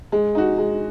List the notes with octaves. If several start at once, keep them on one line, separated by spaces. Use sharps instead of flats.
G#3
D#4 F#4
G#3